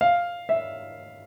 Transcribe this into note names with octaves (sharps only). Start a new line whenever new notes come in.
F5
E5